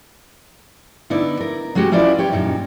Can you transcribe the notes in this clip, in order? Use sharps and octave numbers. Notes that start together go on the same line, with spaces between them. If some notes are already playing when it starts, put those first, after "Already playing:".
D3 B3 D#4 E4 D5
A#4
F#3 G#3 C#4 F#4 G4
C#4 E4 F4 B4 D5
G4 C#5
F#2 A#2 D#4